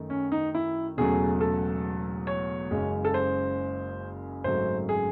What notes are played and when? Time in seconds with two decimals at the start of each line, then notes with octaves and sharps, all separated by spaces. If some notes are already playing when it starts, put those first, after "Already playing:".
Already playing: F#2 D#3 A3
0.10 C#4
0.32 D#4
0.55 E4
0.97 E1 E2 C#3 F#3 A3 G#4
1.41 A4
2.27 C#5
2.71 F#1 F#2 C#3 G#3
3.05 A4
3.14 C5
4.44 G#1 F#2 C#3 F#3 A3 C5
4.89 G#4